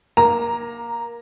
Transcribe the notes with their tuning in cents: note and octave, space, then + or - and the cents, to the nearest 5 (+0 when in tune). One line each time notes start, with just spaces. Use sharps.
A#3 +15 A#5 +0